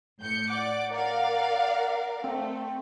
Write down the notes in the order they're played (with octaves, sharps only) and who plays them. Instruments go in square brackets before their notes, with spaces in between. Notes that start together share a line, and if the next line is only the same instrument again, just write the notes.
[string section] A2 G6 C#7
[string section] D5 D6 [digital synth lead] F#5
[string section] A#4 D5 F5
[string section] A3 [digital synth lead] C4